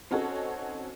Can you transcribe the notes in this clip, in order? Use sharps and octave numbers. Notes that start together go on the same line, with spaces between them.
C4 C#4 D#4 F#4 A4 C#5